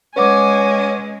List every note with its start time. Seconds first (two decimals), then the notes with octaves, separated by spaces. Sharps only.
0.16 G#3 C#4 B4 F#5 G#5 D6